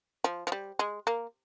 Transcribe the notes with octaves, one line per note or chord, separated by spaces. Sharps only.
F3
F3
G3
G#3
A#3